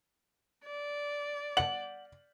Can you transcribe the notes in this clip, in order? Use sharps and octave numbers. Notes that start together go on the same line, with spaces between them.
D5
F#5 F#7